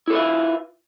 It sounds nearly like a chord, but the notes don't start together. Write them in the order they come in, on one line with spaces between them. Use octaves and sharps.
E4 A4 B4 E5 F4